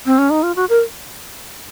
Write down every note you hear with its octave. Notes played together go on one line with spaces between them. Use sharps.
C4
C#4
D#4
F4
F#4
A#4